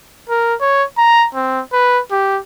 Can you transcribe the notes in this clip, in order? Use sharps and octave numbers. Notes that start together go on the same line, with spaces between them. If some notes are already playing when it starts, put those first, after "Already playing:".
A#4
C#5
A#5
C4
B4
G4